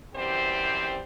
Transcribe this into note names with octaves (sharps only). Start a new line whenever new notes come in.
F#2 E3 G3 C4 G4 C5